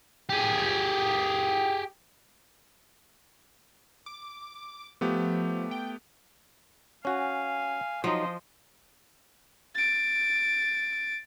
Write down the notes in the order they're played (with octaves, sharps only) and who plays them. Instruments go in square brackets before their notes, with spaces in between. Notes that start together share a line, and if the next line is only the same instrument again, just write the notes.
[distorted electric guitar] G4 G#4
[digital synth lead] D6
[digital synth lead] F3 [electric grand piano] A3 B3 G4
[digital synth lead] G5
[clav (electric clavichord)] C#4 F#4 [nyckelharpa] F5 G#5
[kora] F3 [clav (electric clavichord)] F#3 D#4 [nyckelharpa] C5 D#5
[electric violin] A6 D7